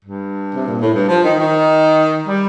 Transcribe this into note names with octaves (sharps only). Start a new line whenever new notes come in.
G2
C3
A#2
A2
G2
F3
D#3
D#3
G3